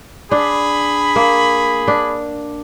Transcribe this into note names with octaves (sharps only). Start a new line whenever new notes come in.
D4 G#4 B5
A#3
D4